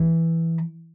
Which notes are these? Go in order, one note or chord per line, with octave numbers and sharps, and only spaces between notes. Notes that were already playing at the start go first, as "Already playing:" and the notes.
Already playing: E3